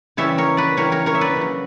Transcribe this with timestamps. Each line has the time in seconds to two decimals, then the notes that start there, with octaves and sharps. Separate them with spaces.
0.17 C#3 E3 G3 C#5 E5
0.38 A#4 C#5
0.57 B4 D5
0.77 C#3 E3 G3 A#4 C#5
0.92 A#4 C#5
1.06 A#4 C#5
1.15 E5
1.21 B4 D5
1.36 C#3 F#3